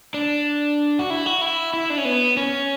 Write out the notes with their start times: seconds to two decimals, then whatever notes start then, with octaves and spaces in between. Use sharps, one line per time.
0.14 D4
0.99 F#4
1.10 E4
1.26 F#4
1.41 E4
1.74 E4
1.90 D4
1.98 C#4
2.05 B3
2.37 C#4